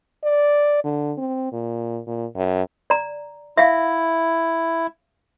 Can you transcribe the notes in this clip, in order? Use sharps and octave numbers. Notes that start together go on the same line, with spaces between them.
D5
D3
C4
A#2
A#2
F#2
D5 A#5
E4 E5 F5